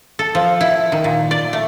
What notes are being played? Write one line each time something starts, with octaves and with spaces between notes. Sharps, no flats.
A4
F3
E4
D#3
A#2
D5
A3